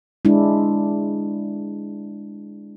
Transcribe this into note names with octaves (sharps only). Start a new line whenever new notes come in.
G#3 D4 E4